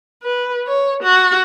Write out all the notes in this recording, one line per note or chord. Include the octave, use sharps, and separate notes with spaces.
B4
C#5
F#4